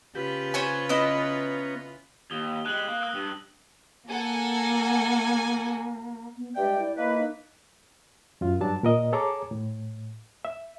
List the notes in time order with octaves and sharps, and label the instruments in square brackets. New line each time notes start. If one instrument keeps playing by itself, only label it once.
[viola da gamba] C#3 F4 B4 [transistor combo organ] G4
[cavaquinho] C5 C#5 G#5
[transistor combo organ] B3 C#4 A#5 [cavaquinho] E4 D#5
[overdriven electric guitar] D#2 [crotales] D#6 G7
[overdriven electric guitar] G3 G#3 [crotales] F#6 F#7 G7
[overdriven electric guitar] A#3
[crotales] D#6 E6 F#6
[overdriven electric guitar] G2
[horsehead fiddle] A#3 [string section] A4 F#5 [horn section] G#5
[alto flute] B3
[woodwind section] G2 G#3 G5 [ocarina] D5 [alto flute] E5
[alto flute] E4
[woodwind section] A#3 B4 [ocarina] D#5
[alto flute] D#4
[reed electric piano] F#2 F4
G2 F#3 D4 A5
A#2 A#4 D#5
G#4 A4 C#5 A#5 D6
A2
E5